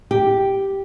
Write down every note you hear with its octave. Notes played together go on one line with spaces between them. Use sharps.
G4